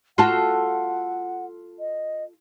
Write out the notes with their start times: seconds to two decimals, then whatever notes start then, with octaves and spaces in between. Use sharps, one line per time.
0.18 F4 F#4 A4 F#5
1.79 D#5